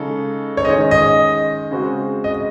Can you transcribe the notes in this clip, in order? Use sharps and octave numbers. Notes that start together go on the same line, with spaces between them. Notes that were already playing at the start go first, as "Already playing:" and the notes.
Already playing: C#3 G#3 D#4 A4
C#5
D#3 G#3 C#4 G#4 C5 D#5
D#5
C#3 G#3 C4 F#4 C5
D#5